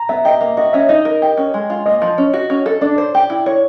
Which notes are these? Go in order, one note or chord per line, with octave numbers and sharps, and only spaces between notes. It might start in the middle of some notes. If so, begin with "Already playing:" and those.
Already playing: A#5
B3 E5
G4 D#5
A#3
F#4 D#5
C#4 E5
D#4 D#5
A#4
G4
C#4
G#3
F4
A#3 D#5
F3
C#4
F#4
C#4
A4
D4 D5
C5
G4
E4
C#5